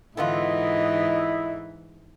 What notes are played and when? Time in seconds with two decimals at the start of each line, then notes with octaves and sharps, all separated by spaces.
0.17 G#2 D3 E3 B3 E4 F4 D#5